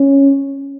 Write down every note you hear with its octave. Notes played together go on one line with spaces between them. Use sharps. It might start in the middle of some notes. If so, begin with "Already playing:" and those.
Already playing: C#4